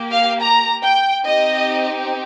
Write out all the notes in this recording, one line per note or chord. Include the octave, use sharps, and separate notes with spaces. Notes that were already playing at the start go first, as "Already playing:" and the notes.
Already playing: A#3 G4
F5
A#5
G5
C4 D#4 G4 D#5